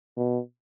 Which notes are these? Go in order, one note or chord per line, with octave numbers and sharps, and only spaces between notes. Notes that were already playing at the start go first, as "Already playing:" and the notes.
B2